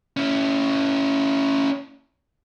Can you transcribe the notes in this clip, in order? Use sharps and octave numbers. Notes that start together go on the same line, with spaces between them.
C#4 E4